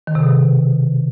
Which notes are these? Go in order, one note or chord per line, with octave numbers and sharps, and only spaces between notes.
D#3
C3
B2